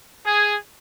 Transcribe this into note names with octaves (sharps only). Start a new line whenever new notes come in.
G#4